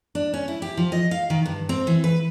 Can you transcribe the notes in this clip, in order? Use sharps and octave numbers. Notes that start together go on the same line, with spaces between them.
D4
C#4
E4
G4
F3
D#5
F5
D#3
G2
C4
E3
B4